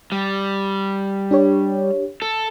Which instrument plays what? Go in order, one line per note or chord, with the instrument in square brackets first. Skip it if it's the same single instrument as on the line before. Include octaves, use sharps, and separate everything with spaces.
[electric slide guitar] G3
[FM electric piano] D4 G4 C#5
[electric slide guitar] A4